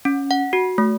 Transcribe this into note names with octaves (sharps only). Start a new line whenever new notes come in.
C#4
F#5
F#4
A3